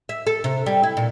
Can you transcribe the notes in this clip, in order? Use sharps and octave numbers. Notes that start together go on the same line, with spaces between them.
E5
A4
C3
G3
E4
A#2